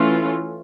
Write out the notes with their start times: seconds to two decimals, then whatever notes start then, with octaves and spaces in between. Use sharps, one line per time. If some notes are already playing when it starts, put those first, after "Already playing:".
Already playing: E3 A3 C#4 F4